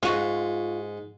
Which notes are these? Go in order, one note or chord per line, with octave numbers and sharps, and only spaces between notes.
G#2 F4 F#4